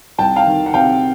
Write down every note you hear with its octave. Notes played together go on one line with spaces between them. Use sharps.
C2 G5 A5
F5 G5
D#3
F#5
C3 F5 G5